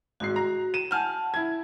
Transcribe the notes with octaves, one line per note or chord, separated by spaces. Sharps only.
G#1 G#2 F#4 C7
A#5
D#7 E7
F#5 G#5 A5 F6 G6
E4 G#6